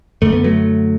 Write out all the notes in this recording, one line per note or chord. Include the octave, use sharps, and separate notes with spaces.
F#2 D3 A3
B3
F#3 A3